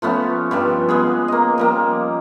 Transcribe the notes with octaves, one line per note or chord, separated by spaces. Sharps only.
F3 A3 B3 C#4
G2 F3 G3
G#3 B3 G#4
A#3 D#5
F3 G3 A#3